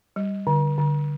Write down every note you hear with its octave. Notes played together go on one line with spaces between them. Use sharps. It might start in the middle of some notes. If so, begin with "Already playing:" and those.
G3
D3
D3